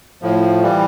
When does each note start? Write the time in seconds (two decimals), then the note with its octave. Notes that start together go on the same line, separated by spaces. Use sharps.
0.22 A2 F3
0.62 E3 G3